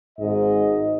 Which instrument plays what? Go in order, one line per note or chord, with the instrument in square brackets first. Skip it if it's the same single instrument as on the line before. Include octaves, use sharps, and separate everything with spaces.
[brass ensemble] G#1 D#5 [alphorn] G#2